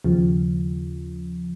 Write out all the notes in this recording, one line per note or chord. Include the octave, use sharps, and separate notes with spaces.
D#2 C#3 F3